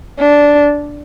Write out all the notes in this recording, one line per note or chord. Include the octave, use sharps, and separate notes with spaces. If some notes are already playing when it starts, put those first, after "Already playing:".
D4